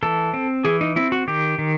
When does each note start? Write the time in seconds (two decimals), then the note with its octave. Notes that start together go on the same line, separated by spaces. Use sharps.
0.03 E3 A4
0.34 C4
0.65 E3 G#4
0.81 D#4
0.96 C4 E4
1.12 F#4
1.28 D#3 G4
1.59 D#3